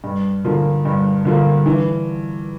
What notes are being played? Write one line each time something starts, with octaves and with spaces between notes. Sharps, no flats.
G2
D3 F3 A#3
G2
D3 F3 A#3
E3